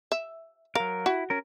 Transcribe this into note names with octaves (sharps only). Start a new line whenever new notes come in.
E5
F#3 A#4 F5
E4 F#4
C#4 A#4